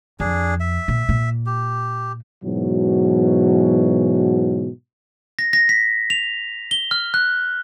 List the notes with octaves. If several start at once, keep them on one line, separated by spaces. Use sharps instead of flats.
F2 D4 G#4
E5
A#2
A#2
G4
G#2 B2 E3 F#3
A#6
A#6
B6
F7
G7
F6
F#6